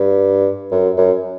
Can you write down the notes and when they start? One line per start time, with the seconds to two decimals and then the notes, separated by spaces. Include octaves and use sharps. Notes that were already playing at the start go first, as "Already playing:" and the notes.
Already playing: G2
0.72 F#2
0.98 F#2